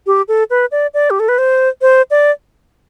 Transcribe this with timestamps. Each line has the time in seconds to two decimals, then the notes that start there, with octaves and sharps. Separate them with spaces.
0.07 G4
0.28 A4
0.50 B4
0.72 D5
0.94 D5
1.10 G4
1.20 A4
1.29 B4
1.38 C5
1.82 C5
2.11 D5